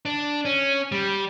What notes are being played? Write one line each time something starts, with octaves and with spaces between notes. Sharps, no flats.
D4
C#4
G3